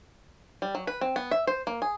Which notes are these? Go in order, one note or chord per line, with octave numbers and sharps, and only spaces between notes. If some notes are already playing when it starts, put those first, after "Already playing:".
G3
F#3
B4
C4
B3
E5
C5
A#3
G#4